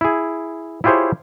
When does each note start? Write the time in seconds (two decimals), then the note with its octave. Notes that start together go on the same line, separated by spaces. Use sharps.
0.01 E4 G#4
0.84 E4 F4 G4 G#4 C5 C#5